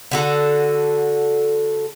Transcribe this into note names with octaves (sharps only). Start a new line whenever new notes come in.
D3 F#4 A4